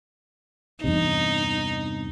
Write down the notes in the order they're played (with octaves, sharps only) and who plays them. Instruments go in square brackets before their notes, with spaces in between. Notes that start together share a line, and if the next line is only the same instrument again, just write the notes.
[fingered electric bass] E2 G2 C3 [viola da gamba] D#4